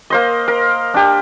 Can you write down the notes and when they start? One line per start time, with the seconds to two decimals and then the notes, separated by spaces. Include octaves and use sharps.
0.10 A#3 C5 D#5
0.48 A#4
0.94 D4 G4